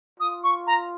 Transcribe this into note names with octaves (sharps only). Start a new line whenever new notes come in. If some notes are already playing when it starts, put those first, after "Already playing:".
F4 D#6
C#6
A#5